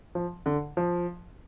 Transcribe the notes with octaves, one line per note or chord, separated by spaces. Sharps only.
F3
D3
F3